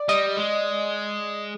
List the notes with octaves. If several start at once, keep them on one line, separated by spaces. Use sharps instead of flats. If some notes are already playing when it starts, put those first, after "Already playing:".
Already playing: D5
G3 D#5
G#3